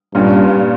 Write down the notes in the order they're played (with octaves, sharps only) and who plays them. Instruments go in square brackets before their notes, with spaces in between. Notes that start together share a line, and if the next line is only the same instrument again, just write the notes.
[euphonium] G2 [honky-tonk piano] A#2 G3 C#4 F4